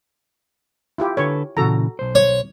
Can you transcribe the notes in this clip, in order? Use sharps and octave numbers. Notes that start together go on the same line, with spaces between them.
E4 F4 G4
D3 A4 B4 C#5
A#2 C#3 E3 F#4 A4 A#5
B1 C5
C#5